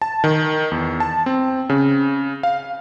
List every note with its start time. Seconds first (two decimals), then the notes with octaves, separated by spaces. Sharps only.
0.02 A5
0.24 D#3
0.71 E2
1.00 A5
1.26 C4
1.69 C#3
2.43 F5